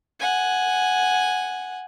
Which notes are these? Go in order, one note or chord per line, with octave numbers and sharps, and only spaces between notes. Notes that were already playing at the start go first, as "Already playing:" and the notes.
F#5 G#5